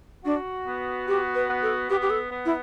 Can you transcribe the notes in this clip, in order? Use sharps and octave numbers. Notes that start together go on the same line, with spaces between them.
D4 F#4
B3
F#4 G4
B4
B3
A4
B3 G4
G4
A4
B3
E4